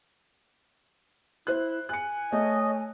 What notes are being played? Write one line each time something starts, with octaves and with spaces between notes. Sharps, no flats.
E4 C5 F#6
G#5 F#6 C#7
A3 C#5 D#5